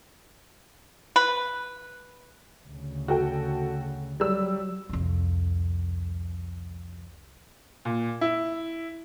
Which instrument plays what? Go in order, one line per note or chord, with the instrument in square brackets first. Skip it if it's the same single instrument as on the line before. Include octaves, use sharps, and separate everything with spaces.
[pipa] B4
[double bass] D2 C#3
[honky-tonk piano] F#4 A4 G5
[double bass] F#3 [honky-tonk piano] G3 E6
[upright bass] C2 F2
[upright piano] A#2
E4